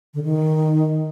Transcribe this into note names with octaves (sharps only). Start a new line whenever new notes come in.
D3
D#3